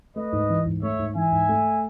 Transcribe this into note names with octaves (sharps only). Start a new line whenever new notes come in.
A3 B4 D#5
G#2
E3
G#2
A3 C#5 E5
G#2
E3 E5 G#5
G#2
A3